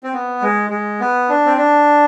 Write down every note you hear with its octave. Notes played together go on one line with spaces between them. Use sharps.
C4
B3
G#3
G#3
B3
D4
C4
D4